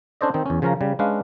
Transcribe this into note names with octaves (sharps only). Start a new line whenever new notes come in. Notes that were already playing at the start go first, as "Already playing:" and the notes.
C#4 D4 A4 C5 D5 D#5
D#3 C4 D#4
E2 C#4
C#3 F3 C#4 A#4 A#5
C#3 G3
G#3 C#4 D4 B4 F5